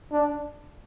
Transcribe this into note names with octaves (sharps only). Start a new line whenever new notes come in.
D4